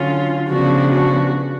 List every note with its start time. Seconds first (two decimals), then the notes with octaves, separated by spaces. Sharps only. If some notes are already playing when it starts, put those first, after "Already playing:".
Already playing: D3 F#3 C#4 F4
0.49 C#3 F3 B3 D4 F#4
0.91 F#4